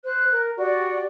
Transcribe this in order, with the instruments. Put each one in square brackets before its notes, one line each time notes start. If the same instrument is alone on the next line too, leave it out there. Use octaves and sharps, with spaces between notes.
[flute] C5 [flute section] F#6
[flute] A#4
[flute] F#4 [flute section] G4 D5